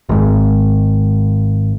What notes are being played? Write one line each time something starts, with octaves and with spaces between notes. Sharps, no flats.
G#1 G#2